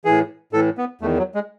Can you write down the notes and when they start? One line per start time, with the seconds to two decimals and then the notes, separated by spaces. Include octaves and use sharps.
0.05 A2 E3 G#4
0.53 A2 E3 A4
0.78 B3
1.01 E2 D#3 A3
1.18 F#3
1.35 G#3